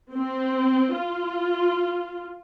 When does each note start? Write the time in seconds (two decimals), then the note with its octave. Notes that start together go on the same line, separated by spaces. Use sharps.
0.13 C4
0.94 F4